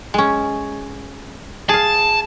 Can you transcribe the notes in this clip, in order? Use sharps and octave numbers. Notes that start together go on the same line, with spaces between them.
G#3 C#4
G#4 F5 A5